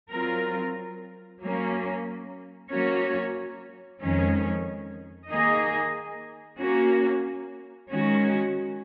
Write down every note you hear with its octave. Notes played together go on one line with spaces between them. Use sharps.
F#3 C4 F4 A#4
F#3 A#3 C#4
F#3 A#3 C#4 F#4 C#5
F2 D#3 G#3 C#4
D#3 A#3 D#4 G#4 D#5
A#3 C#4 F#4
D#3 G#3 C#4 F#4